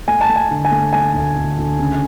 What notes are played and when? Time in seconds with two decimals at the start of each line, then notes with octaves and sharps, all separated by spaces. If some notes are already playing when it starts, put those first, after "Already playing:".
0.07 A3 G#5
0.21 A5
0.29 A3
0.36 G#5
0.51 D3
0.65 G#5
0.71 A3
0.93 A3 G#5
1.15 D2
1.37 D2
1.58 D2
1.80 C#3